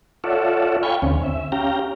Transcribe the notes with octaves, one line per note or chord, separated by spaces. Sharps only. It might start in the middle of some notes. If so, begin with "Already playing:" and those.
F4 A4 C#5 D5 E5 F#5
F5 G5 G#5 B5 C#6
D#2 D3 C4 C#4
E5
C#4 G4 F5 G5 A#5